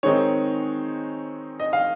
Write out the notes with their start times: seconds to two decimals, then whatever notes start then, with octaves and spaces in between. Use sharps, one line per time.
0.03 D#3 G#3 C4 D#4 C#5
1.60 D#5
1.73 F5